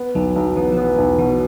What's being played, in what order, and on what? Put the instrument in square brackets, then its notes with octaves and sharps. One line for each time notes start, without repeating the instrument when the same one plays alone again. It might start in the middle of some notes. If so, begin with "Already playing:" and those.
Already playing: [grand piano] B3
[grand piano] B1 [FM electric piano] F#3
[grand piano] B1 [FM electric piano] F#3
[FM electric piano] E3 [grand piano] B3
[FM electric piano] F3
[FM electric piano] E3 [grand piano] B3
[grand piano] B1
[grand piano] B2 [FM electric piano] E3